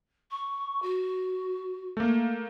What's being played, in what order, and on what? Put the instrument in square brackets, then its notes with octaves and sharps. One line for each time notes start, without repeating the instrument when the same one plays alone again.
[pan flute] C#6
F#4
[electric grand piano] A3 A#3